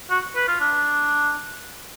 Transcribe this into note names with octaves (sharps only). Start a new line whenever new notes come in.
F#4
B4
F4
D4